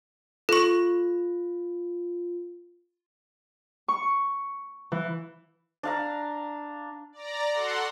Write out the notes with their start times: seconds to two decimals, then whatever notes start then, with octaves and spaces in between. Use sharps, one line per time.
0.49 F4 A4 C#6
3.88 C#6
4.92 E3
5.83 D4 F5 A#5
7.13 D5 A#5
7.52 F#4 A4 F#5 C6